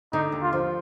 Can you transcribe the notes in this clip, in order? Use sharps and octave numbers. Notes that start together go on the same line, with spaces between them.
D3 D#4
D#2
F4
F3